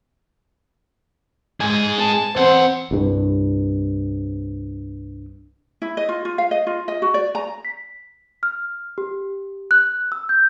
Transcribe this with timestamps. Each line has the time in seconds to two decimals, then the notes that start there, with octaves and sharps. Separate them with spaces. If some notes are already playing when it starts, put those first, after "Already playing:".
1.60 G#2 G#4
1.99 A5
2.37 E2 C4 C5 F#5
2.91 C2 G2
5.82 E4
5.97 D#5
6.09 F4
6.25 F4
6.38 F5
6.51 D#5
6.67 F4
6.88 D#5
7.02 F#4
7.14 D5
7.35 A#5
7.65 B6
8.43 F6
8.98 G4
9.71 F#6
10.12 E6
10.29 G6